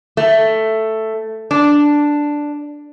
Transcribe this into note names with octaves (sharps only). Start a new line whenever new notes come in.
A3
D4